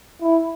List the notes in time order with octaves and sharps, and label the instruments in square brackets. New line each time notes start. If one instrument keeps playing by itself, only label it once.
[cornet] E4